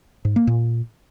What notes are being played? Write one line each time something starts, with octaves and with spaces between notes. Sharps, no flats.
G#2
A#3
A#2